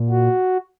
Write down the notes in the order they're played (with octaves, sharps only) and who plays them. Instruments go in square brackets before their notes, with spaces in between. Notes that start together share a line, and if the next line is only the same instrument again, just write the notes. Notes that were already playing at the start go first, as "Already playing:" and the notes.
Already playing: [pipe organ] A#2
F#4